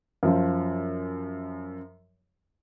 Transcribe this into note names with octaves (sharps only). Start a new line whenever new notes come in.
F#2 F3